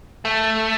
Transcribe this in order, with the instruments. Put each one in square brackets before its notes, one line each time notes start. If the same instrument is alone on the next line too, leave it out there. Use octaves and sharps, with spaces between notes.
[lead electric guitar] A3